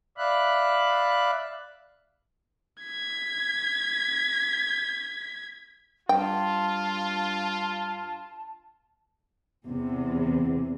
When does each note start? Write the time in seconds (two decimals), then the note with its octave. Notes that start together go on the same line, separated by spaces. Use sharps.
0.18 D5 E5 F5 B5 F#6
2.83 G#6 B6
6.09 G2 F4 G5 A5
9.66 E2 C3